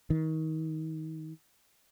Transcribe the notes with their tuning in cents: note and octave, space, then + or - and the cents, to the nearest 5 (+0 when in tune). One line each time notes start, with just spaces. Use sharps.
D#3 +30